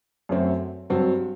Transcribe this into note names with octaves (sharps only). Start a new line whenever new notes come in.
F#2 F#3 A3 C4 F#4
G2 F#3 C4 F#4